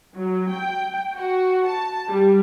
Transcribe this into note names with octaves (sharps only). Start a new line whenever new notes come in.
F#3
G5
F#4
A5
G3